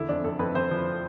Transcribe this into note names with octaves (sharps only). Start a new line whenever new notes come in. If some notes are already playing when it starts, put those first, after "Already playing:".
Already playing: E2 D3 E4
F2 D4
F2 A4
F2 B4
F2 C5
F3